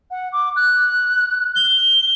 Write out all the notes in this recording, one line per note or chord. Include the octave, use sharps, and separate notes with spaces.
F#5
D6
F#6
G7